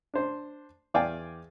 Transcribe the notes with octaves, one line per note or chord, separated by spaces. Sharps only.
D4 C5
E2 D5 F5 G5 G#5